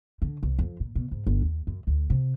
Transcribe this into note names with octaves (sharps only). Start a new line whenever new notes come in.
D3
C2
F2
A#2
B2
G#2
G1
D#2
F#2
D2
C3